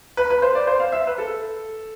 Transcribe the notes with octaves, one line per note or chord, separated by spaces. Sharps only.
B4
B4
C5
D5
C5
F5
E5
B4
A4